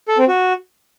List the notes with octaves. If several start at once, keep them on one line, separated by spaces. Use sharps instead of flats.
A4
C4
F#4